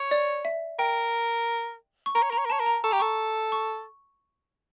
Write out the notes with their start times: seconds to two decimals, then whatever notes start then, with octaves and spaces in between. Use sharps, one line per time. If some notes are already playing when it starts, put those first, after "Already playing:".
Already playing: C#5
0.11 D5
0.45 E5
0.79 A#4 G5
2.06 C#6
2.15 A#4 A#5
2.22 C#5
2.30 A#4 A#5
2.38 C#5
2.45 A#4
2.50 C#5 A5
2.60 A#4
2.66 A#5
2.84 A4 C#6
2.91 G4 A#5
3.00 A4 C#6
3.52 C#6